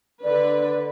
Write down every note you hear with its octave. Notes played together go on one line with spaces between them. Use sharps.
D3 B4 D5